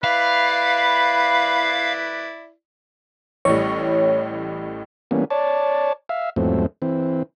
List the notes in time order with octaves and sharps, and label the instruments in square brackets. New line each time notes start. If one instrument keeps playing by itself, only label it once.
[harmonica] E4 D5 [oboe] B4 [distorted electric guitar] F5 [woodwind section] B5
[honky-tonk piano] A1 A2 G3 [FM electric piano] C#5
[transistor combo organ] E3 G3 A#3 B3 C#4
C#5 D5 A5
E5 F5
E2 G#2 F3 F#3 A3 C4
E3 C4